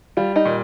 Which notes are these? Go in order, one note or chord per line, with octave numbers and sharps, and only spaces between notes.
G3 F4
D#4
A#2